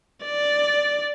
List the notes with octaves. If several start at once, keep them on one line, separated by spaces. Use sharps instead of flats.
D5